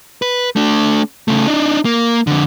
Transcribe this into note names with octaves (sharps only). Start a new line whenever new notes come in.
B4
A3 D4
C#3 A3
D4 D#4
A#3
F2 D3